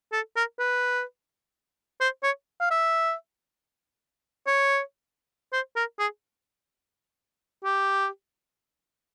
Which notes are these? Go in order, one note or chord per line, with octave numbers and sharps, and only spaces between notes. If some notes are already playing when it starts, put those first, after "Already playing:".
A4
A#4
B4
C5
C#5
F5
E5
C#5
C5
A#4
G#4
G4